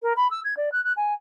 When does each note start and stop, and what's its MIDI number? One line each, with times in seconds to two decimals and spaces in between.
0.02 0.13 70
0.16 0.30 83
0.31 0.40 88
0.44 0.54 92
0.57 0.69 74
0.72 0.83 90
0.84 0.93 90
0.96 1.14 80